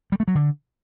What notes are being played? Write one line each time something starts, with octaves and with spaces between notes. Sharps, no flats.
G3
A3
F#3
D3